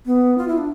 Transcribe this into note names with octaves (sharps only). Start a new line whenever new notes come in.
B3
F4
E4
D4